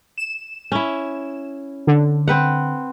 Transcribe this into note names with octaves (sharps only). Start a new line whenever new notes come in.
E7
C#4 E4
D3
C4 B4 F#5